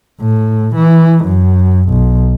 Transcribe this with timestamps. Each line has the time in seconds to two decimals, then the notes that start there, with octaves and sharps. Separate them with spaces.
0.20 A2
0.75 E3
1.25 F#2
1.89 B1